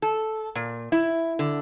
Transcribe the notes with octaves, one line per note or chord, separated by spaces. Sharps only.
A4
A#2
E4
D3